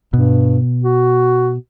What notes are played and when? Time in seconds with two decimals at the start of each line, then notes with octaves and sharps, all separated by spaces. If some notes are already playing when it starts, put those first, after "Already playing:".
0.13 G2 B2
0.84 F#4